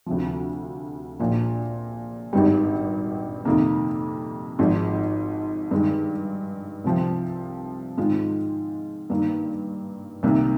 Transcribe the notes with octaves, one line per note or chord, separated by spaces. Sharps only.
D2 C3 F3
A#1 A#2 F3
G#1 G2 D#3 G3
F2 C3 D#3 A#3
G#1 G#2 F3
G2 D#3 G#3
C2 C3 F3 C4
G#2 D#3 G#3 C4 F4
G2 D#3 A#3
C2 C3 D#3 A#3